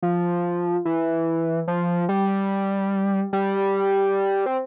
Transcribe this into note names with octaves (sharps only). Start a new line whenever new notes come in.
F3
E3
F3
G3
G3
C4